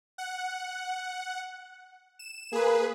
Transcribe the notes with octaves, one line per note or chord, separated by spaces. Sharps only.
F#5
E7
A#3 G#4 B4